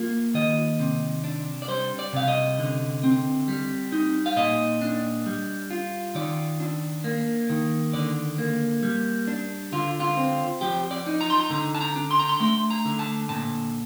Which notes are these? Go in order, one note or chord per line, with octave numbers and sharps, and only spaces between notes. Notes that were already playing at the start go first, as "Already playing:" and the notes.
Already playing: A#3 F4
D#3 D#5
C3
D4
D5
G3 C5
D5
C3 F5
D#5
D3
C4
G3
D#4
F5
A#2 D#5
D4
G3
F4
D#3 D5
D4
A#3
D#3
D3 D5
A#3
G3
D4
D3 F4
F4
C4
F3 G4
D5
D#4
A#5
C6
A#5
D3 A#5
A5
A#5
D4
C6
A#5
C6
A3 C6
A#5
D3
A5
A#2 A5